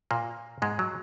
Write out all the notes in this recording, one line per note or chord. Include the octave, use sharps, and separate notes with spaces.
A#2 A#3
G#2 G#3
F#3